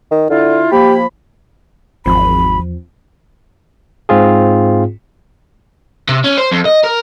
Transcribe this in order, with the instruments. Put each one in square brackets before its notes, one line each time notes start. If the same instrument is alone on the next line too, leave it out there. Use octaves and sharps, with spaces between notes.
[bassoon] D#3
[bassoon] D3 [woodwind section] E4 F4
[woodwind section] F3 A#3 B5 [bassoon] G4
[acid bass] G#1 [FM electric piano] E2 F3 C4 [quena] B5
[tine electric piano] G#2 C4 F4 G#4
[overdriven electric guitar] C3
C#4
C5
F2
D#5
A#4